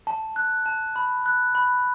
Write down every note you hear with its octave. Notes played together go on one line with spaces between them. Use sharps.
A5
F#6
A5
B5
F#6
B5